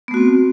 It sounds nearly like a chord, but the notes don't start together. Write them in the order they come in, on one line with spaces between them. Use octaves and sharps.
B3 A3 F#4 C4